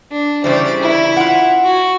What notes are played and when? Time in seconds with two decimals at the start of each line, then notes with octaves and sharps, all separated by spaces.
0.11 D4
0.44 C#3 E3 G3 C5 D5
0.82 E4
1.17 F4 F#5
1.64 F#4